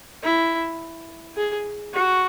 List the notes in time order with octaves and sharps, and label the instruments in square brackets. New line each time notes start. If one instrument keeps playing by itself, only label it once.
[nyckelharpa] E4
G#4
F#4